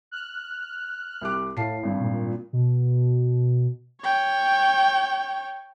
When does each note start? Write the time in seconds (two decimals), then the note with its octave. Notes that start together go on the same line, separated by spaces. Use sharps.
0.11 F6 F#6
1.22 C2 G4 D6
1.57 A2 F5 A5 C7
1.83 G#1 G2
2.00 A#2
2.53 B2
4.02 C#5 G5